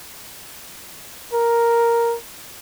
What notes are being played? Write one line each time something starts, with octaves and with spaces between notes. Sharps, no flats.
A#4